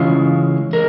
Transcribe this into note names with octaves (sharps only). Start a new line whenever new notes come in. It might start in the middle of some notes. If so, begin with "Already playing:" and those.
Already playing: C#3 E3 G#3 C#4 F4
G#3 A#4